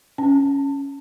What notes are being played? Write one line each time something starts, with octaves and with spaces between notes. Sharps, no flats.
C#4